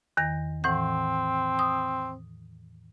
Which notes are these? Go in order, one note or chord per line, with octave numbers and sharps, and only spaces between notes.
E2 D#3 A#6
A2 E3 C4 F#5
D#6